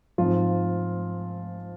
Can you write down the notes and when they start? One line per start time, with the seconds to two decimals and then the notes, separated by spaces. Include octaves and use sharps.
0.18 G#2 F3 C4 F4